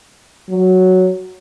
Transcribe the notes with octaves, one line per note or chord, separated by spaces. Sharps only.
F#3